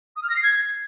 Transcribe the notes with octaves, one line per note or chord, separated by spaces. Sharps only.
D#6
F6
A#6
C7
G#6